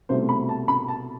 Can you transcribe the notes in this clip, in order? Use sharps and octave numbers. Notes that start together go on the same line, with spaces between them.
C2 B2 A3 C5
B5
A5
B5
A5